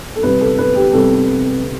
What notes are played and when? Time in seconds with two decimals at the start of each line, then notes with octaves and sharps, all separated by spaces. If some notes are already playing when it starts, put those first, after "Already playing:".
0.16 A4
0.23 C2 C3 G3 C4 B4
0.41 A4
0.58 B4
0.75 G4
0.93 C2 C3 G3 C4 A4
1.64 C3